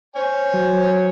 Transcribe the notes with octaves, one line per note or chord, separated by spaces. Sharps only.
C5 C#5 G#5
F#3